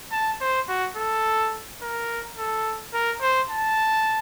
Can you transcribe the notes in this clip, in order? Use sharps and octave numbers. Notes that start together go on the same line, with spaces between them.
A5
C5
F#4
A4
A#4
A4
A#4
C5
A5